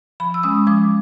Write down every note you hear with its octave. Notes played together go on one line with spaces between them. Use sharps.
F3 B5
E6
G#3 C#4 D#6
F3 D6